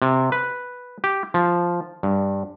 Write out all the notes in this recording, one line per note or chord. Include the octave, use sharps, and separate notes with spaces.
C3
B4
G4
F3
G2